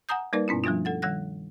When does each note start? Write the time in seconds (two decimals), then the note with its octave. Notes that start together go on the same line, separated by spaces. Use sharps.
0.09 F#5 G#5 A#5 D#6 G6
0.33 G3 A#3 D#4 A#4 B4 D5
0.48 G2 B2 B3 C#4 E4
0.64 F3 G3 A3 D4 F4
0.85 A4 F#5 A6
1.02 D#3 G3 F#5 F#6 A#6